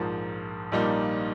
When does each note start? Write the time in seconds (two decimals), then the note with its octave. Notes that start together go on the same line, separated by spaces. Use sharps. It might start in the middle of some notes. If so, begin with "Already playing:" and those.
Already playing: A#1 G#2 F3 A#3
0.72 A#1 A#2 G3 A#3 D#4